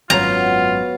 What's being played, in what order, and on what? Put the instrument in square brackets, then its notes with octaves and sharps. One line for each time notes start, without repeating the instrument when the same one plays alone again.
[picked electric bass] G#1 F#2 [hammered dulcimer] B3 F#4 C#5 [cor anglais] F4 [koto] A#5